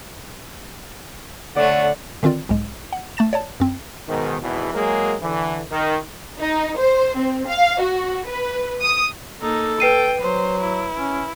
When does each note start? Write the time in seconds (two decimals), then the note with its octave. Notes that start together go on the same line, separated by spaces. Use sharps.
1.56 D3 A3 C#5 D5 F#5
2.23 D3 D#3 C4 F4 D5
2.49 B1 G#2 G#3
2.93 F#5
3.17 A3 A5 A6 E7
3.33 C#5 D5 A5
3.60 F#2 C4
4.08 G#2 B2 D#3
4.42 G#1 E2 B2 E3
4.75 F#3 G#3 A#3 G#4 A#4
5.21 D3 E3
5.71 D#3
6.38 D#4
6.77 C5
7.16 C4
7.47 F5
7.80 F#4
8.26 B4
8.81 D#6
9.42 A#3 D#4 A4
9.80 B4 G5 C7 D#7
10.20 F#3 C5
10.61 E4
10.97 C#4